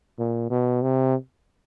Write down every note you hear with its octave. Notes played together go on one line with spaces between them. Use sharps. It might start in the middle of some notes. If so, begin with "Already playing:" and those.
A#2
B2
C3